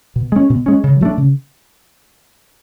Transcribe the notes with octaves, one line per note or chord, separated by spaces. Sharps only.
B2
G#3 C#4
B2
G#3 C#4
C#3
F#3 A3 D4
C#3